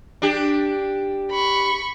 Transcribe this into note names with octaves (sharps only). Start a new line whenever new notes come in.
D4 G4
B5 C#6